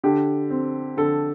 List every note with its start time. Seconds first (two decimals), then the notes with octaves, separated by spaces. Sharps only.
0.04 D3 G4
0.50 C4
0.97 D3 A4